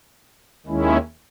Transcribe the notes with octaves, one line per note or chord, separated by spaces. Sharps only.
D#2 D#3 G#3 C#4 E4